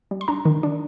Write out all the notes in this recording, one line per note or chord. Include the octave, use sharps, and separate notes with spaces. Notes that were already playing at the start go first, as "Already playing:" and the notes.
G3
C6
D4 A#5
D#3
D4